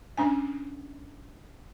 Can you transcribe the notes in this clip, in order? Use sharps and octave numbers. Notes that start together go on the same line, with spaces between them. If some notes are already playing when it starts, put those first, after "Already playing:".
C#4 D4 G#5